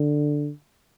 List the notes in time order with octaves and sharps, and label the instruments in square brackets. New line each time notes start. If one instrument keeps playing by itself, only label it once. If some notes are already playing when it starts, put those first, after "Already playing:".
Already playing: [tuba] D3